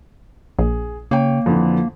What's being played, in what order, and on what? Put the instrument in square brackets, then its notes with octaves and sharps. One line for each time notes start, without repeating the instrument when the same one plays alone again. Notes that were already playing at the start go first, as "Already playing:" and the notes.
[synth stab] A#1 [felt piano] G#4
[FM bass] C#3 [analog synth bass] A#3 [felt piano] C#5 G5
[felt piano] F2 D3 E3 [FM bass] F3